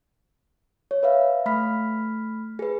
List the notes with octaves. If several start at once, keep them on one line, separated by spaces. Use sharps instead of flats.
C#5
B4 E5 F5
A3 B5 F6 B6
G#4 B4